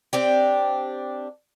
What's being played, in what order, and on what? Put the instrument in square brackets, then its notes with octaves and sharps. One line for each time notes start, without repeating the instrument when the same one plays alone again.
[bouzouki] C4 D4 G4